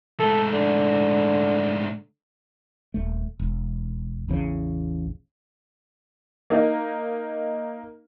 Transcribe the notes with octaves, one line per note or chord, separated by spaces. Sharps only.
G#2 A3 A4
D3
D#1 A3
E1
A1 E2 C#3
A#3 D#4